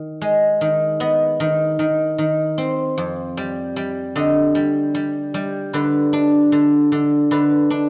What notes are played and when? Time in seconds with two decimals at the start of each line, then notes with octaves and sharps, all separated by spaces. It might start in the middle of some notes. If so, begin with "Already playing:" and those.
Already playing: D#3
0.21 G#3
0.61 D#3
1.00 B3 D#5
1.40 D#3
1.79 D#3
2.18 D#3
2.58 C4
2.98 F2
3.37 G3
3.76 G3
4.15 D3 D#5
4.55 G3
4.95 G3
5.34 G3
5.73 D3 B4
6.13 D4
6.52 D3
6.92 D3
7.31 D3 B4
7.70 D4